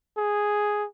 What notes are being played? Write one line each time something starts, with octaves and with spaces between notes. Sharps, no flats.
G#4